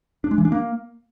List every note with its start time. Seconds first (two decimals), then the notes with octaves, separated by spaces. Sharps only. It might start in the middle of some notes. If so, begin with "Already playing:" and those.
0.24 D4
0.31 G#3
0.38 E3
0.45 D4
0.52 A#3